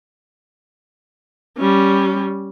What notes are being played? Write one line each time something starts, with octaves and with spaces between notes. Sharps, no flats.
G3 C#4